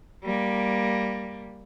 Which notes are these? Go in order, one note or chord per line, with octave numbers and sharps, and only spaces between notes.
G3 A#3